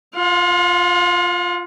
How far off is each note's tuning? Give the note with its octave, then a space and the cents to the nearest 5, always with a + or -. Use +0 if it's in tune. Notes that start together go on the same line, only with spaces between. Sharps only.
F4 +0 F5 +45